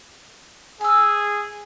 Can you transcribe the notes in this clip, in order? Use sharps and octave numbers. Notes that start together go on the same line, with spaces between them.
G#4 G#5 E6